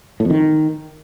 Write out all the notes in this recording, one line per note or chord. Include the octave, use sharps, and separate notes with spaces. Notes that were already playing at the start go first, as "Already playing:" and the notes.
A2
F2
D#3